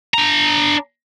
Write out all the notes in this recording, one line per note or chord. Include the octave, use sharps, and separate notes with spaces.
D4 A#5